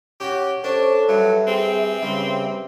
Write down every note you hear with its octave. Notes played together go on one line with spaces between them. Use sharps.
C#4 F#4 G4
C#4 D4 A4 C5
G2 F#3 E5
C4 G#4
G2 C#3